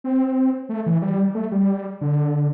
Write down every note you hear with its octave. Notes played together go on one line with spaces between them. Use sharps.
C4
A3
E3
G3
A3
G3
D3